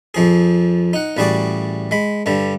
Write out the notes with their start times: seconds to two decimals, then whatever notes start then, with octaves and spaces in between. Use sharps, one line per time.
0.14 F2 F3 G#4
0.93 D#4 F#5
1.17 A1 G3 F#4 G#4 D5
1.91 G#3 B5
2.26 G2 D3 G3